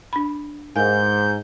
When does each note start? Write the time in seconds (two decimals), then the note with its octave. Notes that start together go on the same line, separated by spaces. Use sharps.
0.13 D4 B5
0.76 G#2 A#4 F5 G#5 G6